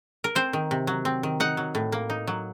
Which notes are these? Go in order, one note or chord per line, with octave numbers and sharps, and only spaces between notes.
A#4
C4 C5
D#3
C3
F#3
C4
D#3
D#4 F#5
F#3
A2
A#3
D#4
F#3